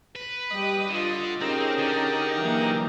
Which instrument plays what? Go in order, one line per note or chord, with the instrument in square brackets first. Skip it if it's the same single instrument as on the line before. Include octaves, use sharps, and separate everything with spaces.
[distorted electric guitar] B4
[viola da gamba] G3 G4 [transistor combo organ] D#5
[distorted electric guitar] D3 [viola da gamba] F4
[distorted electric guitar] C4 [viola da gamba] C#4 G#4 [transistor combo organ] D#4 G4 A#4
[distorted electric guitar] D3
[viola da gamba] E3 F#3 A#3